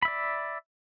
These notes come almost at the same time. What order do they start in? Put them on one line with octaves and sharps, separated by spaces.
B5 E5 D5